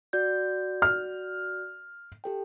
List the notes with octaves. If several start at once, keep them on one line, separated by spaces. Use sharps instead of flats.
F#4 D5 G6
F6
G4 A4 G5